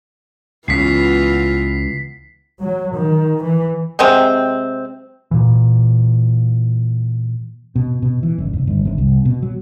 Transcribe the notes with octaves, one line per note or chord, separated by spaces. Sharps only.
C#2 C#3 E3 B3 F4 B6 C7
F#3
D#3
E3
C3 F#3 G#3 C4
A#2 E3
B2
B2
E3
F#1
F1
G1
G1
C2
B2
F#3